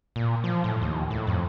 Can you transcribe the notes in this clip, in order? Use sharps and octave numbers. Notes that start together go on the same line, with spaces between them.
A#2
F3
A2
D#2
A2
F2